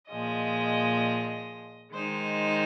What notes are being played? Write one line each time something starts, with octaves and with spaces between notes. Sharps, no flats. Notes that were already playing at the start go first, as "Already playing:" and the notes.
A#2 F3 G#3 D#5
D#3 G#3 D#4 C5